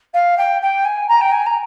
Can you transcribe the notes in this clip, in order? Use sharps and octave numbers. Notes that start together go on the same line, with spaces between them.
F5
G5
G5
G#5
A#5
G5
G#5
A#5